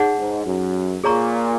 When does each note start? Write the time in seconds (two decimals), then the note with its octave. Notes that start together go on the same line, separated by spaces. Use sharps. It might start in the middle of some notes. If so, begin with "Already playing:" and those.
Already playing: D#4 G#4 C#5 F#5
0.18 G#2
0.46 F#2
1.04 A#2 G#4 C#5 A#5 C#6